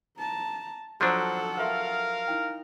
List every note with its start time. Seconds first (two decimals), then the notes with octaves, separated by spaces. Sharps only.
0.18 A5 A#5
1.01 F3 F#3 D4 A4 C5 F#5 A#5 D#6
1.57 A#4 B4 E5 F5 C6
2.27 D#4 E4 G5